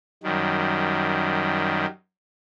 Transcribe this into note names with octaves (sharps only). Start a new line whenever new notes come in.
F#2 D#3 G3